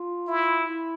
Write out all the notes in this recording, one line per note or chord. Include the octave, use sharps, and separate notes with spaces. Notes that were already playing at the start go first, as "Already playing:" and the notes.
Already playing: F4
E4
E4